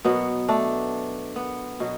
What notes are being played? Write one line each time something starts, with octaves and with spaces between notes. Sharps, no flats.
B2 F#3 B3
A3 D4
B3
B2 F#3